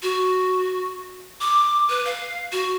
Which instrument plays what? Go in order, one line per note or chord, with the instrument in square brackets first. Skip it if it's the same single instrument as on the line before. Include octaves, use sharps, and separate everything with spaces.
[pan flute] F#4
D6
B4
F5
F#4